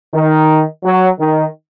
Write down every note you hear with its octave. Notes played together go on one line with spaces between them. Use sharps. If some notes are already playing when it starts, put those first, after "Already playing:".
D#3
F#3
D#3